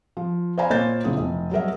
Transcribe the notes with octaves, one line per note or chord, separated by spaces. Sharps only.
F3
C5 D5 F5 G#5 A#5 B5
A#2 A#3 C5 C#5 G6 A6
F#1 A#2 C#3 E4 D#6
F1
F#3 G3 G#4 A#4 D#5 E5